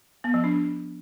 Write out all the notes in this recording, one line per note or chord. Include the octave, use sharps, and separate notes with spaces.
B3
F3
D4